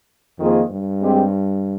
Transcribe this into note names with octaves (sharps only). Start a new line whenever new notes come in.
F2 D#3 A#3 F4 G#4 C5
G2
G#3 C4 G4